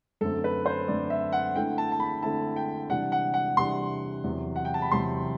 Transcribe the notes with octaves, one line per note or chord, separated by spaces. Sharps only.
F#2 D3 A3 C4 A4
B4
C5
F#2 D3 A3 C4 D5
E5
F#5
D3 A3 C4 E4 G5
A5
A5
B5
D3 A3 C4 E4 A5
G5
C3 E3 G3 D4 F#5
F#5
F#5
C3 E3 G3 D4 C6
E2 C3 F#3
F#5
G5
A5
B5
E2 C3 F#3 C6